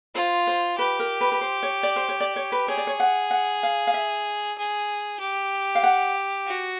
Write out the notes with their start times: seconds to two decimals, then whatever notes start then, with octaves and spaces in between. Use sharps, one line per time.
0.15 F4 C5
0.47 C5
0.78 G4 B4
1.00 A#4
1.21 B4
1.32 B4
1.41 C5
1.63 C#5
1.83 D5
1.96 C5
2.09 C#5
2.20 D5
2.36 C#5
2.52 B4
2.68 G#4 C#5
2.78 D5
2.87 C#5
3.00 F#5
3.31 F#5
3.63 F5
3.87 F5
3.94 E5
4.58 G#4
5.20 G4
5.75 F5
5.83 F#5
6.47 F#4